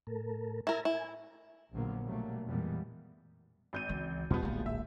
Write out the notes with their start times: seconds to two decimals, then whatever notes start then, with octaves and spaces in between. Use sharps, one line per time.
0.07 A2 A4 A#4
0.67 E4 A#4 A5 A#5 E6
0.85 E4 G#5
1.73 A#1 D3 F3 F#3 A#3 B3
2.04 B2 F#3 G3 A3 A#3
2.47 F2 A#2 E3 G3 G#3 B3
3.73 G#1 G6 D#7
3.89 C#2 E3
4.30 E2 B2 F3 G3 B3 C#4
4.43 D1 A#1 G#3 A#3
4.66 E5